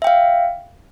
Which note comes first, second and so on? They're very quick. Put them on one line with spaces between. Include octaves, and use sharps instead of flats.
E5 G5 F5